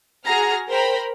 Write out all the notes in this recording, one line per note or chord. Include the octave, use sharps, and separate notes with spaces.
F#4 G#4 A#5 F6
A#4 C5 G5 A#5 B5